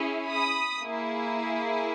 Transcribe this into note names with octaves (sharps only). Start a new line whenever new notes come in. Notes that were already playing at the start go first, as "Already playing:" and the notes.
Already playing: C#4 E4 G#4
B5 D#6
A#3 E4 G#4